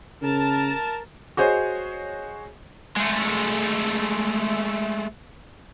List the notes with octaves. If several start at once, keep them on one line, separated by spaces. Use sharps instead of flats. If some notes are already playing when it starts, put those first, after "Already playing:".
C#3 A#4 A5
F#4 G#4 C5 C#5 D#5
G#3 A3